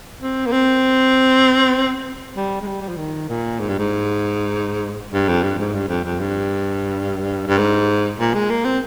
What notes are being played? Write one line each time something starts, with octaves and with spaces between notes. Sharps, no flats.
C4
A#3
C4
G3
G#3
G3
G3
F3
D#3
A#2
G#2
G2
G#2
G2
F2
G2
G#2
G2
F2
F2
G2
G2
G#2
A#2
G#3
A#3
C4